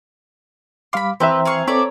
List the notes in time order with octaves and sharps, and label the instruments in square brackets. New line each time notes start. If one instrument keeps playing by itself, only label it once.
[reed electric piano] G3 F5 D6 [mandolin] B5 C6
[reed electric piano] E3 E5 [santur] C4 A#5 [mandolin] G4 B4
[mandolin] G#4 F5 C#6
[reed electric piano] C4 A4 [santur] C#5 [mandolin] D5 E5